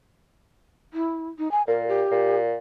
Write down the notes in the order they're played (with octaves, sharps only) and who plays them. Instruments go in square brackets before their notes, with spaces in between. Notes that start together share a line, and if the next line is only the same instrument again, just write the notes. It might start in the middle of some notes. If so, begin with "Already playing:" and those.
[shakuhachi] E4
D#4
G#5
[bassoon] A#2 [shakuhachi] A#4
[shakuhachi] G4
[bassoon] A#2